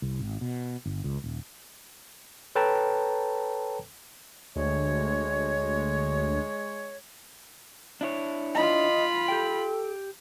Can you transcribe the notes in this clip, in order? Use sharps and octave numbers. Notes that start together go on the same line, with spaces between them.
C2
G#1
B2
G1
C#2
D#1
A4 B4 C#5 G5 A5 A#5
D2 G#3 C#5
D4 E4 C#5
F4 D#5 B5
G4 A4 G5